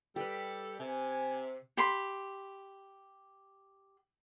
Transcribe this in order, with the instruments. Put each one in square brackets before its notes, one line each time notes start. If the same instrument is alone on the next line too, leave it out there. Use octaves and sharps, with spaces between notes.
[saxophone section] G3 A4 [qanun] G4 B4
[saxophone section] C3 [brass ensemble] G#5
[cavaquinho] G4 B5 C6